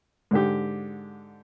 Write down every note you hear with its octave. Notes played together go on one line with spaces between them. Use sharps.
G#2 D3 G4